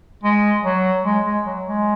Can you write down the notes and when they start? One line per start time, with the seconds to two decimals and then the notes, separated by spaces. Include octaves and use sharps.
0.24 G#3
0.64 F#3
1.04 G#3
1.24 G#3
1.45 F#3
1.65 G#3